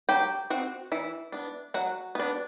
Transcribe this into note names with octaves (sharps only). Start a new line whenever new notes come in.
F#3 G4 G5
C4 F#4 F#5
E3 E4 E5
B3 D4
F#3 F#4 F#5
B3 D4